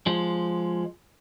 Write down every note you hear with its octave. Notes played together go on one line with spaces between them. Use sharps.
F3 G#3